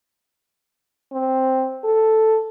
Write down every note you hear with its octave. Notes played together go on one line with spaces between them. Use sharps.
C4
A4